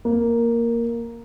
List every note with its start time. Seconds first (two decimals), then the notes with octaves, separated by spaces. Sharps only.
0.05 A#3